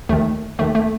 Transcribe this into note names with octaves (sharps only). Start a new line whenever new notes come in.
D#2 D#3 A3
D#2 D#3 A3
A3